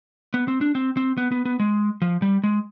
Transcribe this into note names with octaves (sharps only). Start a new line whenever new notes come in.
B3
C4
D4
C4
C4
B3
B3
B3
G#3
F3
G3
G#3